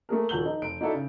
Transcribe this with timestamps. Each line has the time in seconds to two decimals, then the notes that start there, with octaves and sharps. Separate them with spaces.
0.09 A3 A#3 G#4 A#4
0.29 D#1 F3 F#4 G6 F#7 G7
0.45 D#4
0.61 F1 D7
0.81 D#4 E4 F#4 A4 D5 E5
0.94 C#3